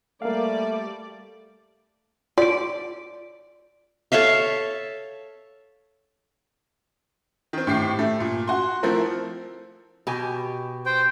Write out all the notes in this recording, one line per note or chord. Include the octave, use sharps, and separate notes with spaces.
G3 A3 A#3 D5 F5
F4 D5 D7
A4 C#5 E5 F5
D#3 C4
A2 G4 C7
A3
A#2
F#4 C6
F3 A3 C4 E4 A#4
B2 G4 G#5
C5 G5